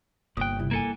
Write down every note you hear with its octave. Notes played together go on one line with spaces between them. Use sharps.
G1 C2 A#3 G5 D#6 F#6
C3 G3 E4
F3 A#3 A4 G#5